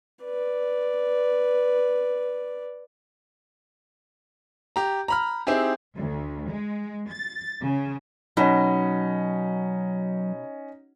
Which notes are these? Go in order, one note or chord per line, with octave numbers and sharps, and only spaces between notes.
B4 D5
G4 A#5
A#5 B5 F6
C4 D#4 E4 G4 G#4
D2
G#3
A6
C#3
B2 F#3 C#4 D#4